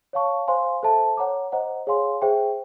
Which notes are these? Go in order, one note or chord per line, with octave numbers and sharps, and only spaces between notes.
C#5 F5 A5 C#6
C5 F5 G#5 C6
A4 C5 E5 A5
C#5 F#5 A#5 D6
C5 D#5 F#5 A#5
G#4 C#5 F5 G#5 C6
G#4 C5 E5 G5